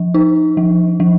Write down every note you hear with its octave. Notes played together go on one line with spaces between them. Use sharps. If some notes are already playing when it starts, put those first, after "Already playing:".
Already playing: F3
D#4
F3
F3